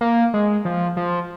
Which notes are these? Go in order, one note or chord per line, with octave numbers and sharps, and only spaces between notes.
A#3
G#3
F3
F3